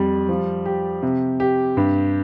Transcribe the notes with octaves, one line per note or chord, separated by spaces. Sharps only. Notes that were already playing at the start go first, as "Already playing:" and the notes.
Already playing: F2 G3
F3
G4
C3
G4
G2